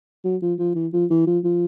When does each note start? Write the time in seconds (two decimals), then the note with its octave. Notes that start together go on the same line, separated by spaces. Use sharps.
0.24 F#3
0.42 F3
0.59 F3
0.75 E3
0.93 F3
1.10 E3
1.27 F3
1.44 F3